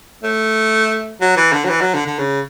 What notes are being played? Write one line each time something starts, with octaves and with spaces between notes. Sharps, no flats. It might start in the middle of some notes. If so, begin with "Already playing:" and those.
A3
F#3
E3
D3
F#3
E3
F#3
D3
D3
C#3